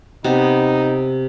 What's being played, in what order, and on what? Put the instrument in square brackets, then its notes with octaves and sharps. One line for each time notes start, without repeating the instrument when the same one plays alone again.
[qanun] C3 B3 [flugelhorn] D#4